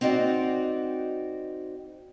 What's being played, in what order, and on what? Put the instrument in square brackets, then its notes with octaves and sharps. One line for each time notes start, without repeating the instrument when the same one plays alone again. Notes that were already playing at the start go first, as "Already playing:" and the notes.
[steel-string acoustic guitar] C4 D#4 F#4 D5